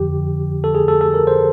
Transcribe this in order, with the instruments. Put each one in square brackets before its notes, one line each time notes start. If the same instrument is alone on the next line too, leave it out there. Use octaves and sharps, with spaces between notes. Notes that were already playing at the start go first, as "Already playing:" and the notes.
Already playing: [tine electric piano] F2 D3 F3 G4
A4
G#4
A4
A4
A#4
C5